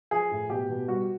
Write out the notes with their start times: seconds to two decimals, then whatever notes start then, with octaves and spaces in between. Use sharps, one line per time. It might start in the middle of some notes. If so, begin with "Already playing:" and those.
0.11 F3 G#4
0.31 A2
0.50 B2 G4
0.70 B2
0.88 G3 F#4